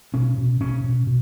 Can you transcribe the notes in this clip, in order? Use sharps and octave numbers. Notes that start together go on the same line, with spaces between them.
B2 C#4
B2
B2 C#4
B2
B2